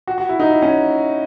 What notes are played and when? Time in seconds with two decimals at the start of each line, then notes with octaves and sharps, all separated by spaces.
0.07 F#4
0.18 F#4
0.29 E4
0.40 D#4
0.50 E4
0.62 C#4